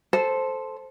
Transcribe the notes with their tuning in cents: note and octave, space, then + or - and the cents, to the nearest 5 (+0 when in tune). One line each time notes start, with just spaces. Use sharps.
A4 -5 C5 +0